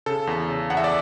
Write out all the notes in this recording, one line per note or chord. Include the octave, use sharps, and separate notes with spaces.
C#3 A4
E2
C#3
E2 F#5
E5
D5